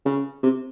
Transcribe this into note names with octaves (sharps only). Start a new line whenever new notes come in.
C#3
C3